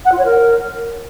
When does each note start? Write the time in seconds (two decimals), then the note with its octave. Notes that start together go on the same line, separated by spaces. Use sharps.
0.05 F#5
0.11 F4
0.18 C#5
0.25 A#4